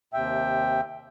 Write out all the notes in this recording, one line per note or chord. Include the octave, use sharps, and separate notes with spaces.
D#2 C3 E5 G5